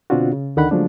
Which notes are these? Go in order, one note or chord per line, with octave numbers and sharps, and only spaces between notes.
B2 D3 C4 D4 F4 F#4
C#3
D2 D3 D#3 F#5 B5 F#6
C#3 F3 F#3 G#3 A3 D4